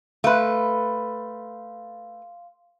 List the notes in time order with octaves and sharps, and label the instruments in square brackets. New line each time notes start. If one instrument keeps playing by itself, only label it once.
[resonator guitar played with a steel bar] A3 B4 [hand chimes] F5 C6